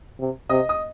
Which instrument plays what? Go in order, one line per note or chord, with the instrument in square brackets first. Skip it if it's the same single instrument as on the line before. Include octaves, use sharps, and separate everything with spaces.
[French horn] C3
[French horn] C3 [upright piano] D#5 D#6
[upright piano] D#6